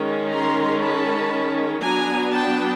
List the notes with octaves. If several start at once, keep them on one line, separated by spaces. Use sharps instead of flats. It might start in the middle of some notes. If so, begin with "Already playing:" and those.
Already playing: D#3 G#3 C#4
A#5 C6
A5 B5
F#3 B3 D4 G#5 A#5
G5 A5